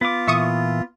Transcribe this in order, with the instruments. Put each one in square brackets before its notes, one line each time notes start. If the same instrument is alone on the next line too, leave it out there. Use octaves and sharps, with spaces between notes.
[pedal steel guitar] B3 D6 [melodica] F4
[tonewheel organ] A#2 E3 [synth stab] E5 C#6 D#6